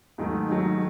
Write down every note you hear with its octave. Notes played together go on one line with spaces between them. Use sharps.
G#2 D#3 F#3 A3
G#2 D#3 F#3 A3